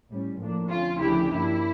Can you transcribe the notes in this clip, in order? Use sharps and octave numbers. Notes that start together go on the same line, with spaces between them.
A2 G3 C#4
A2 F3 A#3 D4
F2 D3 A3 C#4 F4
D2 C#3 F3 A3 D4 E4 G4
G2 F3 A#3 D4 E4